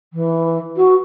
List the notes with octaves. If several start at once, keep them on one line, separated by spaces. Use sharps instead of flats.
E3
F#4